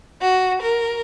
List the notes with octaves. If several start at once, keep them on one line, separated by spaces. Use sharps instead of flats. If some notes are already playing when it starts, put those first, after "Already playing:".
F#4
A#4